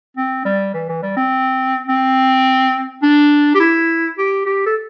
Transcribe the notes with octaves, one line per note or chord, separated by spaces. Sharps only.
C4
G3
E3
E3
G3
C4
C4
D4
G4
E4
G4
G4
A4